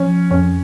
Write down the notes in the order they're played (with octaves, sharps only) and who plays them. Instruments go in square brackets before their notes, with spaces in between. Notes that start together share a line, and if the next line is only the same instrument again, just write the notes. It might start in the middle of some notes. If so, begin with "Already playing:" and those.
Already playing: [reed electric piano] F3 [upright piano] C#4
[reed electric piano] F2 [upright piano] C#4